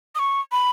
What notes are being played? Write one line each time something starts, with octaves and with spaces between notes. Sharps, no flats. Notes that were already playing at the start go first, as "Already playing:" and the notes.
D#6
C#6
B5